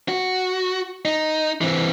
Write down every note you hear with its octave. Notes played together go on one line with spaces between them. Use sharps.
F#4
D#4
E3 C4